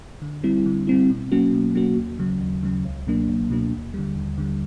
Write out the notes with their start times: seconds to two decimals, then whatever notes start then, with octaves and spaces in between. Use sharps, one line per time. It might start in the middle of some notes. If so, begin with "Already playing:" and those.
0.22 D3
0.43 G3 C4 E4
0.66 D3
0.87 G3 C4 E4
1.10 B2
1.32 F#3 A#3 C#4 F#4
1.53 B2
1.75 F#3 A#3 C#4 F#4
1.97 D#2
2.19 C#3 F#3
2.40 D#2
2.63 C#3 F#3
2.85 C#2
3.07 B2 F#3 A#3 D4
3.29 C#2
3.50 B2 F#3 A#3 D4
3.72 D#2
3.94 D3 G3
4.15 D#2
4.38 D3 G3